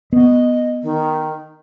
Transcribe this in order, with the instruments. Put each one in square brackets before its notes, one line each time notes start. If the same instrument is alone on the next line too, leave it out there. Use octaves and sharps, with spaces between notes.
[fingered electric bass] B3 [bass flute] D#5
[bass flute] D#3